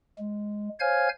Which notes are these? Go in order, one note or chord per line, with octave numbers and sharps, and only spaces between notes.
G#3
C5 C#5 F5 G#5 F6 G#6